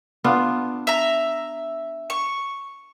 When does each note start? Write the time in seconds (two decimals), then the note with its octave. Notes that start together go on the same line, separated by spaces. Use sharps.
0.24 B3 D4 F4
0.87 E5 A#5
2.10 C#6